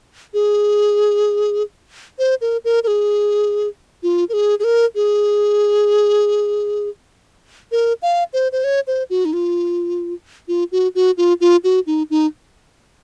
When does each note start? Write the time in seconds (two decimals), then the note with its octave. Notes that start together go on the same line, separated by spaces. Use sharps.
0.34 G#4
2.19 C5
2.41 A#4
2.65 A#4
2.84 A#4
2.87 G#4
4.03 F4
4.29 A#4
4.33 G#4
4.60 G#4
4.64 A#4
4.95 G#4
7.72 A#4
8.02 F5
8.33 C5
8.52 C5
8.64 C#5
8.87 C5
9.10 F#4
9.25 D#4
9.33 F4
10.48 F4
10.72 F#4
10.95 F#4
11.17 F4
11.41 F4
11.64 F#4
11.87 D#4
12.10 D#4